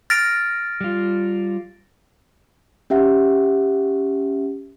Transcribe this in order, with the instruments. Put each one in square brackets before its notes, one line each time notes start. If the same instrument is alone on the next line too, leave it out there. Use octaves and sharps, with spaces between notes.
[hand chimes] F6 [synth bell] A6 A#6 D7
[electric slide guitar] G3 F4
[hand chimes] C#4 G4 E5 F#5